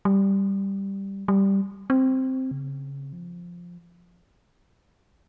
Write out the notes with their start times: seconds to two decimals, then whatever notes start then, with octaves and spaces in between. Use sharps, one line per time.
0.05 G3
1.28 G3
1.90 C4
2.51 C#3
3.13 F3